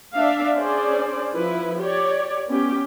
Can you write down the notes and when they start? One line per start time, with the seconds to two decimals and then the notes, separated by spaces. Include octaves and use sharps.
0.15 D4 E5 F5
0.56 C#4 D4 G#4 C5 D5
1.34 F3 E4 B4
1.80 G4 C#5 D5
2.48 B3 C#4 G4